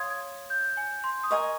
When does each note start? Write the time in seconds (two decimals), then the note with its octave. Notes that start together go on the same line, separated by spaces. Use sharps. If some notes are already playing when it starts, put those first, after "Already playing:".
Already playing: C#5 F5 C6 D#6 G#6
0.10 G#6
0.50 G6
0.77 G#5
1.04 C6
1.24 D#6
1.31 A#4 D#5 G#5 C#6